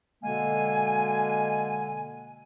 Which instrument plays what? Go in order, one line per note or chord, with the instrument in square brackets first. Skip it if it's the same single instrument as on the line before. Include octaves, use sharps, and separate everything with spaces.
[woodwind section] B2 D3 G#3 A#3 G#5